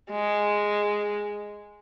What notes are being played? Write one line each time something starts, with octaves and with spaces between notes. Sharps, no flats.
G#3